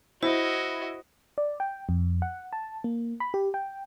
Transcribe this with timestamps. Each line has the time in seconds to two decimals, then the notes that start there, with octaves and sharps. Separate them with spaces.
0.23 E4 F#4 C5 D#5
1.38 D5
1.60 G5
1.89 F2
2.22 F#5
2.53 A5
2.84 A#3
3.20 B5
3.34 G4
3.54 G5